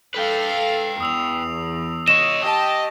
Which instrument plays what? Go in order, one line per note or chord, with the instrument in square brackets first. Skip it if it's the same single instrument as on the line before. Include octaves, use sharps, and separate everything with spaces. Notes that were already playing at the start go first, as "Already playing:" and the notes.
[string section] A4 F5 [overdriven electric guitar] B4 G5
[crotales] C7
[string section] E2 [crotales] D#6 E6 F7
[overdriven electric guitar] C#5 D#5 [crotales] C#6 A#6 [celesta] E7
[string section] G4 A5 [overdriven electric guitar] D#5